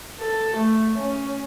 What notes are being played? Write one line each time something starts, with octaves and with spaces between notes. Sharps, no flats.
A4
A3
C#4